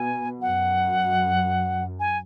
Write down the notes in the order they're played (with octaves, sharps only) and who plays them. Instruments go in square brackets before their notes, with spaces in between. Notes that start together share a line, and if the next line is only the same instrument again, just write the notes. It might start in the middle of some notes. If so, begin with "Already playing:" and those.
Already playing: [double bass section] B2 [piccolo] G#5
[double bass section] F#2 [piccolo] F#5
[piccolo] G#5